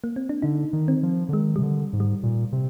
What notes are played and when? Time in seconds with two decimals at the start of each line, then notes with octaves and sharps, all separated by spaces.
0.04 A#3
0.16 C4
0.29 D4
0.42 D3 D#4
0.73 D#3
0.88 C4
1.03 F3
1.29 D3
1.33 D#3 G#3
1.56 C3 G3
1.63 D3
1.93 G#2
2.00 G3
2.24 A#2
2.53 C3